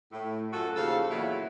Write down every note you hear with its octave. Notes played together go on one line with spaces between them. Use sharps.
A2
F#2 F3 F#4 A4
D#2 C#3 F3 A4 F5
E2 A#2 F#3 E4